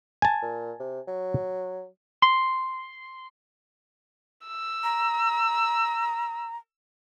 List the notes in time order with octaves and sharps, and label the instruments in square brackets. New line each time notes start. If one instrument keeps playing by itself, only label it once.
[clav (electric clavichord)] G#5 A5
[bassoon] A#2
C3
F#3
[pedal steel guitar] C6
[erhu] E6
[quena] A#5